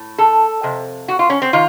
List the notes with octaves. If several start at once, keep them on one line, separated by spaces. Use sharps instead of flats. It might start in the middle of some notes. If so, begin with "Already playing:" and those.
Already playing: A2
A4
F2 C3
F#4
F4
C#4
C4
D#3 F4